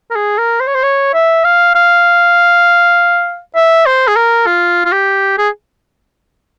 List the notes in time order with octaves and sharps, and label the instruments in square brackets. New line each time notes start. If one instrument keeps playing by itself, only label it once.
[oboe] A#4
G#4
A#4
C5
C#5
C5
C#5
E5
F5
F5
E5
C5
G#4
A#4
F4
F4
G4
G#4